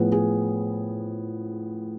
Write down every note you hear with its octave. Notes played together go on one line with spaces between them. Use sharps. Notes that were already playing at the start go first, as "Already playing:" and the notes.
Already playing: A2 F3 B3 G#4
G#4